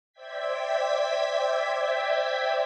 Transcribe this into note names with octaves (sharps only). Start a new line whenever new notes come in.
C5 D5 E5 G5 G#6 B6